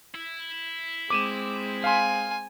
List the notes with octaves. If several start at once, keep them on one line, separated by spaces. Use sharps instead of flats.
E4
G#3 C4 D6 D#7 E7
F5 G#5 C6